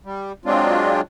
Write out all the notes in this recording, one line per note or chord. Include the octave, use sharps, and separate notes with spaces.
G3
F#3 G#3 C4 D4 F4